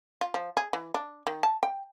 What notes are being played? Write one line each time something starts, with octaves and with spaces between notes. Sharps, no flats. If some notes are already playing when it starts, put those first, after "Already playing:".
F4
F3
G#4
E3
D4
D#3
A5
G5